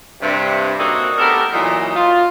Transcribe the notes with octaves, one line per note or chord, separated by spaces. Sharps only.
G2 C3
A#3 C4 D4 D#4 F#4 A4
A3 B3 G4 A4 A#4
A#2 E3 F#3 D#4
F4